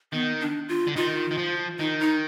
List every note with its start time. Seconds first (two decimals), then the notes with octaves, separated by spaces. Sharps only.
0.13 D#3 B3
0.40 D4
0.69 F4
0.87 D3
0.96 D#3 F4
1.31 D#3
1.37 F3
1.79 D#3 D#4
2.00 D#4